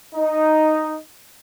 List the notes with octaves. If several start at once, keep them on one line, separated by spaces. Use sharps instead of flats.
D#4